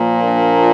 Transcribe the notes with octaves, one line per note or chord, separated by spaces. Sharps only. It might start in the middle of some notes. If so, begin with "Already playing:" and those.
Already playing: A#2 F3 A#3
D4